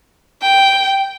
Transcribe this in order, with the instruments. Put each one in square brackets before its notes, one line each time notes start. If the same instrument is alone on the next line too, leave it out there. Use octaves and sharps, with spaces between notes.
[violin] G5